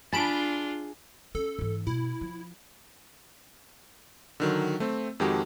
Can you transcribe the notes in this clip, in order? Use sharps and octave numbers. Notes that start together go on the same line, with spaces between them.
D4 F4 G#4 A5 B5 C6 D7
C#4 A4
G#2 E3
B2 E4
F3
D3 D#3 F#3
A3 C4
F2 D#3 G#3 F#4 G4 A5